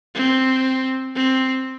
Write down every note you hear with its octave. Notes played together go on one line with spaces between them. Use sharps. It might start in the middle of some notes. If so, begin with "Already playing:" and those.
C4
C4